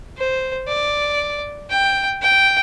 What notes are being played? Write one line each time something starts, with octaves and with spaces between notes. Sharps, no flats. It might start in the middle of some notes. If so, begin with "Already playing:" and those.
C5
D5
G5
G5